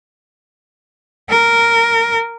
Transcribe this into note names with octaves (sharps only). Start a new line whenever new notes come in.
A#4